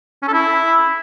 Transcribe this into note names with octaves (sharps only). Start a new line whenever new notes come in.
C#4
A4
E4